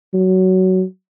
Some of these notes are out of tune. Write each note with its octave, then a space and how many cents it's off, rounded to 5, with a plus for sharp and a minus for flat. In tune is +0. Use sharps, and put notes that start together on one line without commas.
F#3 +15